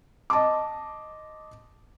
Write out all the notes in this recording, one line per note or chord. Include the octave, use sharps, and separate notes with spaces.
D#5 A5 C6 D6